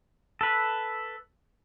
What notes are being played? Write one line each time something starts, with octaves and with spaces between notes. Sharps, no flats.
A4 B4